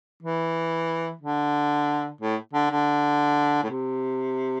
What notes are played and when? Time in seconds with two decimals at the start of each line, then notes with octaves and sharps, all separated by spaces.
0.22 E3
1.21 D3
2.21 A2
2.53 D3
2.70 D3
3.63 A2
3.70 C3